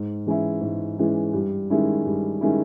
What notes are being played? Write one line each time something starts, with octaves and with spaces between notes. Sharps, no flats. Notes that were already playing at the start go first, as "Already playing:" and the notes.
Already playing: G#2
E3 G#3 C#4 E4
G#2
E3 G#3 C#4 E4
G2
D#3 G#3 C#4 E4
G2
D#3 G#3 C#4 E4